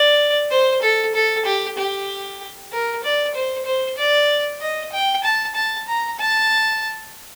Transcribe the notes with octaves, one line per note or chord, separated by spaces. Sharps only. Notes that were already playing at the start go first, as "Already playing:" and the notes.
Already playing: D5
C5
A4
A4
G4
G4
A#4
D5
C5
C5
D5
D#5
G5
A5
A5
A#5
A5